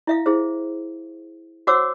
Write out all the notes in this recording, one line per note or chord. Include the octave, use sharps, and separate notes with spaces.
E4 E5 F5
E4 G#4 C5
F#4 C5 C#5 F#5 D6 E6